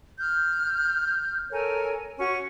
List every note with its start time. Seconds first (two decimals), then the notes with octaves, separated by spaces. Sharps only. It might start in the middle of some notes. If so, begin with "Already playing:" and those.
0.19 F6 G6
1.50 A4 A#4 C#5 G#5
2.18 C#4 F#4 C#6